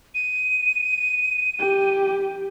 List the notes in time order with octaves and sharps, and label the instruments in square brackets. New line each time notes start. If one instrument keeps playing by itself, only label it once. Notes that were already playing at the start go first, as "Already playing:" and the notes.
[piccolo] D#7
[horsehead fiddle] G4